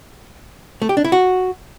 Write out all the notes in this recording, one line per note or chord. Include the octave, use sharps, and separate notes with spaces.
A3
G4
D4
E4
F#4